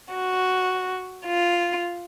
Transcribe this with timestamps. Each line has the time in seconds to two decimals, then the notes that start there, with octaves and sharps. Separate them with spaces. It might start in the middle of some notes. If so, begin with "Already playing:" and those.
0.14 F#4
1.25 F4